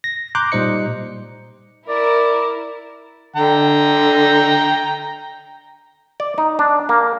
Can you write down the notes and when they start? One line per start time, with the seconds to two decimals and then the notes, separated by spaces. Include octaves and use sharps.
0.04 A#6
0.35 A#5 C6 D6 F#6 G6
0.52 A#2 G3 D#4 C5 D#5 C#7
1.89 E4 A#4 D5
3.36 D3 G5 A#5
6.20 D5
6.38 D#4
6.59 D4
6.89 A#3